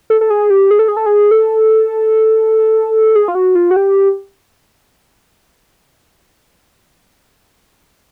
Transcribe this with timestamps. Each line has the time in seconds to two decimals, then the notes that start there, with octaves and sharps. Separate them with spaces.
0.10 A4
0.21 A4
0.30 G#4
0.50 G4
0.71 G#4
0.79 A4
0.88 G#4
0.97 A4
1.06 G#4
1.31 A4
3.15 G#4
3.28 F4
3.35 F#4
3.55 F4
3.71 F#4
3.76 G4